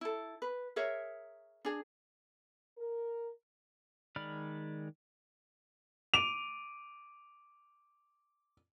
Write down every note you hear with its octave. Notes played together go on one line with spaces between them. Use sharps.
E4 A4
B4
G#4 A#4 C#5 E5
D4 G#4
A#4
D#3 G#3 D5 B5 F6
D6 D7 D#7 F7